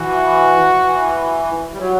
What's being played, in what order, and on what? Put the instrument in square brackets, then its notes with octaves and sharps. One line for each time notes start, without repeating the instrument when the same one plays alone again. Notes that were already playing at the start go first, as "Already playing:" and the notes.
Already playing: [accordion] E3 [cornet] F#4
[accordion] E3
G3
F#3